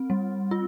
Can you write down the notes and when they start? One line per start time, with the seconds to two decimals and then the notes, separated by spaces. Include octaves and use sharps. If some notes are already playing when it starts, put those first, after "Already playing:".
Already playing: C4
0.10 G3
0.51 F4